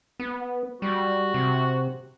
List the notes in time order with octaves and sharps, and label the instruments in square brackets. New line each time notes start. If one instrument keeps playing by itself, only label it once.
[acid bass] B3
[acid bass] G3 [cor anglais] F#4
[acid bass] C3